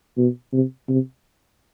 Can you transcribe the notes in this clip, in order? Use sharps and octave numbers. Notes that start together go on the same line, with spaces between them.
B2
C3
C3